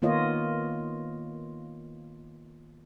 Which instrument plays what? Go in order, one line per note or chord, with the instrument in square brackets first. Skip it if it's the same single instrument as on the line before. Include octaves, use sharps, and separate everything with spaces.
[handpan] D#3 A#3 B3 F4 C#5 D#5